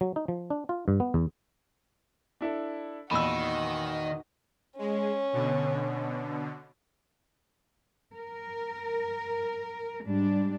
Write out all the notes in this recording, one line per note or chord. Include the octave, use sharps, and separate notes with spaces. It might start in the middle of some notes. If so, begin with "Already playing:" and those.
F#3
D#4
F3
D4
F4
G2
B3
E2
D4 E4 A4
E2 A#2 D#3 F#4 D#5 B5 E6
G#3 C#4
B2 D3
A#4
G#2 G3 D4